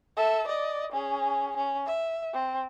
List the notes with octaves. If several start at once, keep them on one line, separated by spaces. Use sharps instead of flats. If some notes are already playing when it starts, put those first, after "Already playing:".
A4 E5
D5 D#5
C#4 G#4
C#4
E5
C4